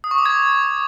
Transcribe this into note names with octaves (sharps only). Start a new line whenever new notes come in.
D#6
C#6
D6
G#6